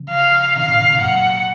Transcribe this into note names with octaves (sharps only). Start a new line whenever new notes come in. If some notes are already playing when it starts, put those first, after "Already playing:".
Already playing: C#3 F3
F5
C3 D#3 F5
A2 C3
C3 D#3
A2 C3
F#2 A#2 F#5